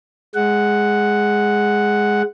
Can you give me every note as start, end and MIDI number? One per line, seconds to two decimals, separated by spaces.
0.35 2.22 56
0.35 2.22 78